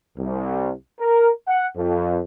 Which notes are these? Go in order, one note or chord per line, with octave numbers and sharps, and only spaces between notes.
C2
A#4
F#5
F2